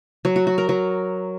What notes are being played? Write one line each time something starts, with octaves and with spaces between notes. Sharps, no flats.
F#3
F#4
F#4
A#4
F#3